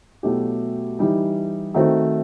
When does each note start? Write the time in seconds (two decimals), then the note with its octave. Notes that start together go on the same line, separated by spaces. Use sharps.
0.23 B2 F#3 A3 E4 G4
0.99 E3 G3 D#4
1.75 D#3 A3 C4 F#4